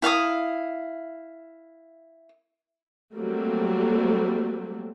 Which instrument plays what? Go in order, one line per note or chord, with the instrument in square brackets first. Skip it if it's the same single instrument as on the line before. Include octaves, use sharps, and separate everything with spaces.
[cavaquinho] E4 F5 G#5 D#6
[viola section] F#3 G3 A3 A#3 C4